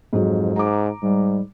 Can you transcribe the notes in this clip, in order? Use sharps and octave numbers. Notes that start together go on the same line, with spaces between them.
F2 G#2 F#3
G#2 A#5 D6
G#2 G3